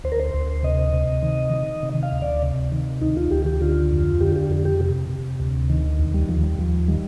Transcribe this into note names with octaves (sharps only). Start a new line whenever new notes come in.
D2 C5
A#4
C5
D2
C3 D#5
C3
D#3
D#3
C3
F5
D2
D5
C3
D#3
D2 D#4
F4
D2 G4
G4
D3 F4
F2
D3 G4
F4
G4
F2
G4
C3
C3
D2
D#3
D#2
G3
D#2 F3
G3
D#2 F3
D#3 G3